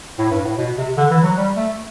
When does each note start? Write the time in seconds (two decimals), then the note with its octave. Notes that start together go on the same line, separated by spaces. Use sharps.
0.18 A2
0.31 G2
0.45 A2
0.58 B2
0.78 C3
0.97 D3
1.11 E3
1.24 F#3
1.37 G3
1.57 A3